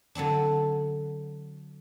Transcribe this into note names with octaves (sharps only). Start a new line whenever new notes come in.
D3 F#3 C4 D4